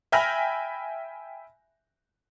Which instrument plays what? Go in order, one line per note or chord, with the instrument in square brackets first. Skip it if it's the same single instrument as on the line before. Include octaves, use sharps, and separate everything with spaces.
[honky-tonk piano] E5 G5 G#5 B5 F6 A#6